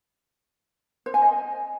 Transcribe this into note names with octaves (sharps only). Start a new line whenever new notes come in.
C5
G#5
D#5